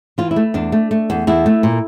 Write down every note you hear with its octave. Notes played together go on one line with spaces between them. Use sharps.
E3 F4
E4
A3
E2 D4
A3
A3
E2
E2 E4
A3
A#2